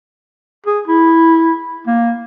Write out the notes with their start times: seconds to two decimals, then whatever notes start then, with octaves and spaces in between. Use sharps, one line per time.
0.67 G#4
0.88 E4
1.88 A#3